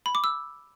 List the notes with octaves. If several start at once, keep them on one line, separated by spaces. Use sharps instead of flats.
B5
D6
E6